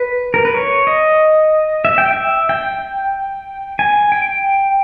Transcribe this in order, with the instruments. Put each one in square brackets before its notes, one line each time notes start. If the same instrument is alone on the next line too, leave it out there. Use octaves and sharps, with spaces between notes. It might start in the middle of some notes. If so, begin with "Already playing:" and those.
Already playing: [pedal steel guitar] B4
A#4
B4
C#5
D#5
E5
G5
E5
G5
G#5
G5